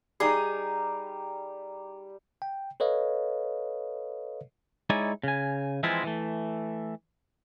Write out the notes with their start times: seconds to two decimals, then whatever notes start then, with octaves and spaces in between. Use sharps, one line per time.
0.20 G3 D#4 G#4 A#5
2.42 G5
2.80 A4 B4 C#5 D#5 F5
4.90 G#3 D#4 E4 C#5 D5 G#5
5.24 C#3 G#5
5.83 E3 F3 G#3 C4 E4 F4
6.04 E3 A3